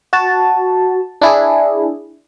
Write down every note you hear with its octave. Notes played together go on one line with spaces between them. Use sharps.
F#4 A5
D4 E4 G#4